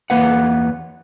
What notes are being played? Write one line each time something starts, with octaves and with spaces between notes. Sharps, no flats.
E2 A#3 B4 F#5